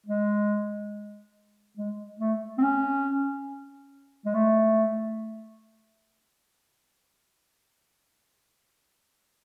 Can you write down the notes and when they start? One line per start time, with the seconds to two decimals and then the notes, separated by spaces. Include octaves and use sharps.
0.06 G#3
1.77 G#3
2.19 A3
2.58 C4
2.63 C#4
4.25 G#3
4.34 A3